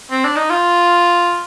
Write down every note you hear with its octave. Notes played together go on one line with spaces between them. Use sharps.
C4
D4
D#4
F4